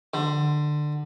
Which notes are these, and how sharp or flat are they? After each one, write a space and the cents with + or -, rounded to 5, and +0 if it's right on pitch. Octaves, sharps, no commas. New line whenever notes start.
D3 +20